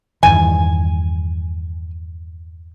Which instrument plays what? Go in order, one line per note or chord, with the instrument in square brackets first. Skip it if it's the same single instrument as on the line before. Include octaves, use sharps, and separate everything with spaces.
[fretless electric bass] E2 G2 D#3 [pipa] G#5